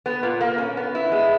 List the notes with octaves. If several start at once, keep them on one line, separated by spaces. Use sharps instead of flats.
B3
A#2
A#3
C#4
B3
E4
G#3